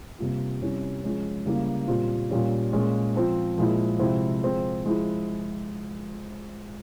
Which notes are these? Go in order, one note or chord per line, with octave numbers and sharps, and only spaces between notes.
C3 G3 A#3 F4
C3 G3 C#4 E4
F3 G#3 C#4
C#3 G3 A#3 E4
A#2 G3 C4 F4
A#2 G3 C#4 F4
A#2 G#3 C#4 F4
F3 C4 F4
A#2 F3 G#3 E4
C3 F3 G#3 C4 E4
F3 G#3 C4
F3 G#3 E4